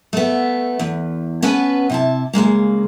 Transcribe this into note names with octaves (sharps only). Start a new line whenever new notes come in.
A3 B3
E2
B3 C#4 B4 G#5 A5
C3 E4 A5
C#3 F3 G#3 A#3